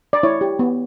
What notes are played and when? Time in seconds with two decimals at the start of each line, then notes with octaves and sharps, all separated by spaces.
0.13 D5
0.23 E4 C#5
0.41 G4
0.59 B3